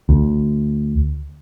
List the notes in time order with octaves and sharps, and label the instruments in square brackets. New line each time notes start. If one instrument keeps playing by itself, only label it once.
[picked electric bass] D2